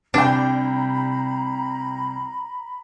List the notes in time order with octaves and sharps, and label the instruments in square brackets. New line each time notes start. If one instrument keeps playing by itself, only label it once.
[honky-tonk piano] C2 G5 [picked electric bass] C3 [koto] D4 [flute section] A#5 B5